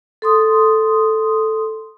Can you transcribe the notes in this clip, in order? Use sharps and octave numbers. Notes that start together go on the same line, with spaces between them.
A4 C6 D#6